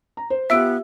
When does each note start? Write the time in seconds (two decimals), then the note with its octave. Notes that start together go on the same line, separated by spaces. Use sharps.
0.17 A#5
0.30 C5
0.50 B3 F4 G4 E5 E6 D7